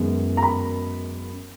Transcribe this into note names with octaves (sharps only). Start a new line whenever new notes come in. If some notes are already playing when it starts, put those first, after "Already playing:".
Already playing: F#2 D#3 G#3 B3
A#5
B5